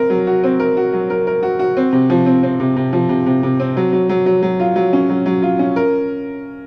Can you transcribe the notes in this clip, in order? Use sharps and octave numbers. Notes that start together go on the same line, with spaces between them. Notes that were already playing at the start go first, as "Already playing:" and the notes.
Already playing: C4 A#4
F#3
F#4
C4
A#4
F#4
F#3
A#4
A#4
F#4
F#4
C4
C3
F3
C4
C4
C3
C3
F3
C3
C3
C3
C4
F#3
F#3
F#3
F#3
F#3
F4
F#3
C#4
F#3
F#3
F4
C#4
A#4